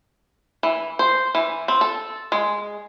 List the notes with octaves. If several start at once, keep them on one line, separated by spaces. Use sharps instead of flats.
E3
C5
E3
C4
A4
G#3